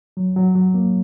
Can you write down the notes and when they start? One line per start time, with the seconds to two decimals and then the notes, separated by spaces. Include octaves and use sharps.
0.17 F#3
0.36 F#3
0.55 F#3
0.74 A#3